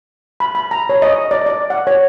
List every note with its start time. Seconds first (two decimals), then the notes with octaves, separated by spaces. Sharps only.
0.40 B5
0.55 B5
0.71 A#5
0.89 C#5
1.02 D#5
1.31 D5
1.46 D5
1.70 F#5
1.87 C#5